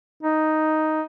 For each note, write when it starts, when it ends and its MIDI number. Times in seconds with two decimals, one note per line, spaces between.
0.23 1.03 63